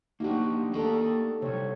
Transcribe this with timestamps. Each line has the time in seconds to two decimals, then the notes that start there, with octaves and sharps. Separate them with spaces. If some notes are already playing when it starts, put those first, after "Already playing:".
0.20 A#3 D4 D#4 F#4 G4
0.73 A#3 D4 G4 A4 D#5
1.42 C3 G3 C#5